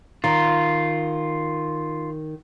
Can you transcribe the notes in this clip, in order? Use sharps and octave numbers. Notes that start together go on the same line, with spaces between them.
D#3 F4